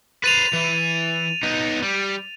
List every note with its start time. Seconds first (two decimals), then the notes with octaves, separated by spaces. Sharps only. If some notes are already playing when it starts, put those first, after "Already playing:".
0.24 B4 C5 A6 D#7 F7
0.53 E3
1.43 B3 D#4
1.82 G3